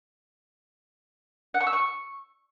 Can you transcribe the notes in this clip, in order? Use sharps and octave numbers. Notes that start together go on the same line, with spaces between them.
F#5
C#6
E6
C#6